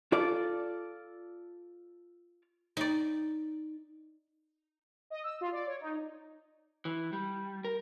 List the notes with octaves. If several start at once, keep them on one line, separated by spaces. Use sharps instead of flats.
F4 A4 D5
D#4 D5
D#5
E6
F4
D5
C#5
D#4
E3
G3
A#4